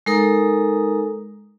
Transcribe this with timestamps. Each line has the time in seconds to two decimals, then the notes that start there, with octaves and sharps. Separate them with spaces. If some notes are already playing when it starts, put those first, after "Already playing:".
0.06 G#3 D#4 A4 A#4 A#5 D#6